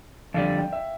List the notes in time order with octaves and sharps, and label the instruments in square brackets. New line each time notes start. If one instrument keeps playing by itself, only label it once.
[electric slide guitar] F2 D3 G3 [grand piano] F5
[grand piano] G5
E5